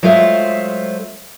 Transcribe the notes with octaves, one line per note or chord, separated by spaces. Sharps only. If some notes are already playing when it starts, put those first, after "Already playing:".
F#3 G#3 A3 F4 C5 E5